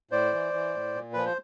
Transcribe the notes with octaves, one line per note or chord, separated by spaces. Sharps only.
A2 C5 D5
E3
E3
A2
A#2
F3 B4
C5